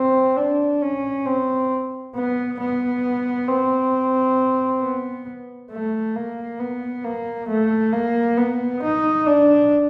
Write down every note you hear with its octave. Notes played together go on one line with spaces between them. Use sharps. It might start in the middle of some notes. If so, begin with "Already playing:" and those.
Already playing: C4
D4
C#4
C4
B3
B3
C4
B3
A3
A#3
B3
A#3
A3
A#3
B3
D#4
D4